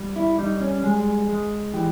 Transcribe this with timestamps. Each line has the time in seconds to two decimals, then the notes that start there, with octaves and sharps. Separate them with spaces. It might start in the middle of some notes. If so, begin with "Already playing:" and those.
Already playing: G3
0.16 E4
0.38 G3 D#4
0.61 C#4
0.83 G#3 G#4
1.29 G#3
1.73 E3 G4